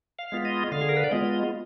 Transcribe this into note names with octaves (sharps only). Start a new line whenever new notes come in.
F5
G#3 B3 F4
D#5
D3 F5
G#4
A#4
B4
D5
G#3 B3 F4 D#5